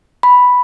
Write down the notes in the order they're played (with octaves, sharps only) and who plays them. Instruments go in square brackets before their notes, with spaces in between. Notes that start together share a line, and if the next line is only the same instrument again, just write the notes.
[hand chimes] B5